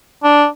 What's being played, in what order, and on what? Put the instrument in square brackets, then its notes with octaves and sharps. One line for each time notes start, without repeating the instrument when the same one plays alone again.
[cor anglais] D4